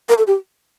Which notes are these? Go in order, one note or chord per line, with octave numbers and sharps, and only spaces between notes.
A#4
A4
G4